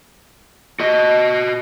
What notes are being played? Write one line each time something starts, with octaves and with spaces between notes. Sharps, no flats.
F#4 D#5